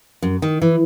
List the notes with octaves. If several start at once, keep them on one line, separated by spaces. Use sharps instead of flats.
F#2
D#3
E3